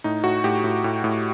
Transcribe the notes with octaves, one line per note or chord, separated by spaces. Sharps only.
A2 D#4
A2 F#4
A2 G4
A2
A2
A2